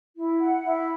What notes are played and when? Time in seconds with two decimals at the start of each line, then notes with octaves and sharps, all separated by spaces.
0.16 E4
0.40 F#5
0.64 E4